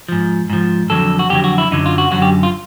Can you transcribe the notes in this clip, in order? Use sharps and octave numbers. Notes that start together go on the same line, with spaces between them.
G#2 F3
G#2 F3
F2 D3 F#3 A4
F#4
F2 D3 F#3 G4
F#4
E4
F#2 D3 F#3 D#4
F4
F#4
F#2 D3 F#3 F#4
G4
F4